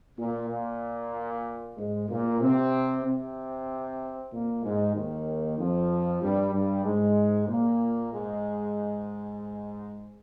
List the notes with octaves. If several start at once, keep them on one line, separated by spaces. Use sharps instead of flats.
A#2
A#2
G#2 G#3
A#2 A#3
C3 C4
C3 C4
A#2 A#3
G#2 G#3
D#2 D#3
F2 F3
G2 G3
G2 G3
G#2 G#3
A#2 A#3
G#2 G#3